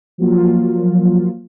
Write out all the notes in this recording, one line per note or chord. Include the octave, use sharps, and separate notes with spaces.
F3 F#3 A#3 F4